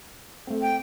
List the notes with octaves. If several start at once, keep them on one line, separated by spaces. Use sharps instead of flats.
A3 C4
G5